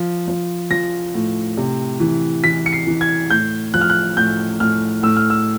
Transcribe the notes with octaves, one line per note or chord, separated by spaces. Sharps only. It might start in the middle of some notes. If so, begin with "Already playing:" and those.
Already playing: F3
F3
F3 A#6
A2
C3
E3
E3 B6
C#7
C7
E3
G#6
A2 G6
F3 F#6
F6
F#6
A2 G6
A2 F6
A2 E6
F6
E6